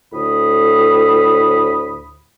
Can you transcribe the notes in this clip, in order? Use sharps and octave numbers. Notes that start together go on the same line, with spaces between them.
D2 A2 B5 D#6